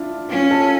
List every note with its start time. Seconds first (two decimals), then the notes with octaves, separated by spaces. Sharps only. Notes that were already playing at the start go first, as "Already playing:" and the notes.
Already playing: D4 E4 F4
0.30 C#4 F4
0.51 A4
0.64 F4